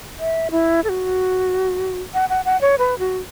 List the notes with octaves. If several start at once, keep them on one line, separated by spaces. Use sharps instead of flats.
E5
E4
A4
F#4
F#5
F#5
F#5
C#5
B4
F#4